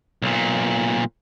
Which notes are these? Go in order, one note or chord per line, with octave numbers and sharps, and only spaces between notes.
B1 A#2